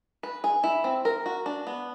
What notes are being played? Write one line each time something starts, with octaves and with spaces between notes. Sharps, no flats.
B4
G#4
E4
C4
A#4
F#4
D4
B3